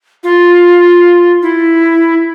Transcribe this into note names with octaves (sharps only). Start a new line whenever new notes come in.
F4
E4